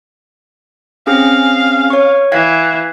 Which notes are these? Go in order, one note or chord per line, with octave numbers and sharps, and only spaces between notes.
C4 C#4 G#4 F5
C#5 C#6
E3 F5 G#6